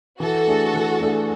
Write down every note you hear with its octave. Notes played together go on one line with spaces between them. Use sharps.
E3 F#4 A4
A3 D4 G#4
E3
A3 D4 G#4